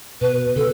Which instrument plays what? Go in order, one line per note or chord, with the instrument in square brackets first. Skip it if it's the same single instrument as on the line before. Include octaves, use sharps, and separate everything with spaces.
[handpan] B2 [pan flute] B4
[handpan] B2
[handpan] C#3 [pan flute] A4